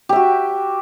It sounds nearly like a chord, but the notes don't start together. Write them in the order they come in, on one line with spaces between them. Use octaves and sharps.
G4 E5 F#4